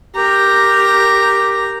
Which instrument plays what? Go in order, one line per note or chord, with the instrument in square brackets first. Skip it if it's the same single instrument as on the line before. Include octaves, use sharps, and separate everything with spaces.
[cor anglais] G4 [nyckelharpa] A#4 A#5